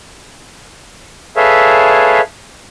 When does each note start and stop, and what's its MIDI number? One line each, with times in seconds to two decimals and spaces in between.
1.36 2.21 68
1.36 2.21 69
1.36 2.21 71
1.36 2.21 73
1.36 2.21 76
1.36 2.21 77